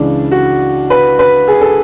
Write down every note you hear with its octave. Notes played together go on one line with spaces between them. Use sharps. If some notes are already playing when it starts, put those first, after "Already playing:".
Already playing: C#2 C#3 E3 D4
F#4
B4
B4
G#4
A4